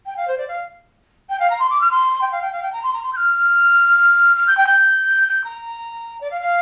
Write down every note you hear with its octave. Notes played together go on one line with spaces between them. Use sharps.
G5
F5
C5
D5
F5
G5
F5
A#5
C6
D6
F6
C6
G5
F5
G5
F5
G5
A#5
C6
A#5
C6
G6
F6
F6
G6
G5
G6
G6
A#5
D5
F5
F5